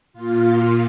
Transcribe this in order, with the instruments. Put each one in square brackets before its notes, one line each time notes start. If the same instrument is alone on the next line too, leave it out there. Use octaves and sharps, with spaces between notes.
[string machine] A#2 F4